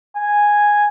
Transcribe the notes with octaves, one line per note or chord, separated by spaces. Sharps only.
G#5